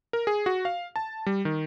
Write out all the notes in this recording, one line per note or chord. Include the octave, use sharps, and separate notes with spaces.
A#4
G#4
F#4
F5
A5
G3
D#3